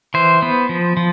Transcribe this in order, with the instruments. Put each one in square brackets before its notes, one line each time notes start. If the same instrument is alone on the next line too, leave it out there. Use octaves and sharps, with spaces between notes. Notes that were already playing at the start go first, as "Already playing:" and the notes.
[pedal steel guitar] E3 C5
B3
F3
F3